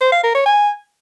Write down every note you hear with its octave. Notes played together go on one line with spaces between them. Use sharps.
C5
F5
A#4
C#5
G#5